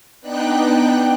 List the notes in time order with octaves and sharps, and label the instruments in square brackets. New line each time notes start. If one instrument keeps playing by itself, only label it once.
[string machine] B3 D4 D#4 G5 F#6